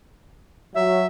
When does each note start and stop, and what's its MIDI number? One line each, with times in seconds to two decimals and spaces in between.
0.75 1.05 54
0.75 1.06 76